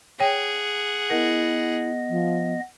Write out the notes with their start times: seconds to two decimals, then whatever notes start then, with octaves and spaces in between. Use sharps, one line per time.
0.20 G#4 C#5 F#5 G5
1.10 B3 E4 A#4 D#5
2.09 F3